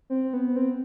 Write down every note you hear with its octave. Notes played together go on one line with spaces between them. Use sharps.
C4
B3
C4